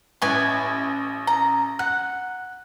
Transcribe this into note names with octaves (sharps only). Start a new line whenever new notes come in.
A1 E4 B4 G#5 C#6
A#5
F#5 F#6